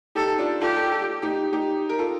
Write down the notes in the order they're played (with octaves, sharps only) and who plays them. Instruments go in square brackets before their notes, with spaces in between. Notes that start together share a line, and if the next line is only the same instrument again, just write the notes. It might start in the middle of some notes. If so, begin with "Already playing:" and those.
[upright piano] D#4 G4 [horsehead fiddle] A4
[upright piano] D4 F4
[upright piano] F4 A4 [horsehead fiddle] G4
[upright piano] F4 A4
F4 A4
D#4 G4
D#4 G4
A#4
F4 A4